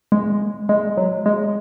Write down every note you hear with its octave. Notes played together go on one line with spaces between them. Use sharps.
G#3
G#3
F#3
G#3